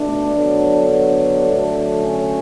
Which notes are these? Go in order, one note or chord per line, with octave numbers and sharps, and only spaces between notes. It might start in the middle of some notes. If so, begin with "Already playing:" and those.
Already playing: B2 A3 D4
D3 F#3 B3
D4
D3 F#3 A3
C#4